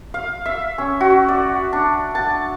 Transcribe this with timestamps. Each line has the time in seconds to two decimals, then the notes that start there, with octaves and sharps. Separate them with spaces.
0.14 F5
0.46 E5
0.78 C#4
1.01 F#4
1.28 D5
1.73 D4
2.15 A5